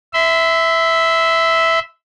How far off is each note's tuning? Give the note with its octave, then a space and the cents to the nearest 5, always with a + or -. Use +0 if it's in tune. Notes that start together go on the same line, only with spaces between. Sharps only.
E5 -5 C6 -40